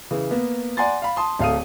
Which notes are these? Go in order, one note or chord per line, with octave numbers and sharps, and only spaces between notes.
C#3 E3
A#3 B3
D5 F#5 G#5 A#5 C6 A6
F5 B5
A5 C6 D#6
D1 A3 F5 D#6 D#7